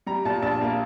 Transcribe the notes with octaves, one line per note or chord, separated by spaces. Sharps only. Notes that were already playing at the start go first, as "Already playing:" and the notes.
G3 A#5
A#2 A5
A#1 A5
A#3